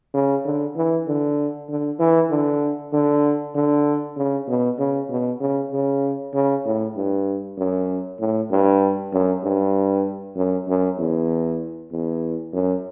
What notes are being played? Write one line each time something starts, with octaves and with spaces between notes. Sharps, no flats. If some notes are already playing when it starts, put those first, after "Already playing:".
C#3
D3
E3
D3
D3
E3
D3
D3
D3
C#3
B2
C#3
B2
C#3
C#3
C#3
A2
G2
F#2
A2
G2
F#2
G2
F#2
F#2
E2
E2
F#2